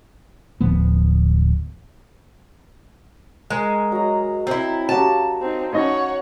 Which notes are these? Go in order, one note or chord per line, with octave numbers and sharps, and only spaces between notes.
D1 F3 B3
G#3 A#4
F#3 D#5 A#5
C4 E4
F#3 C#4 F#4 G4 F5 A5
C4 D#4
C#4 D#4 C#5 D#5 F#5